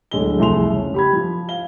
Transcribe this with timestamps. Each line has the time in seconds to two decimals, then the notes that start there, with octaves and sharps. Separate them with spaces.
0.11 D1 D3 G#3 A4 G7
0.38 C2 F2 A3 G#4 C6 F7
0.72 C#3 C#4
0.94 G4 B5 G#6
1.13 F3
1.49 F5 G7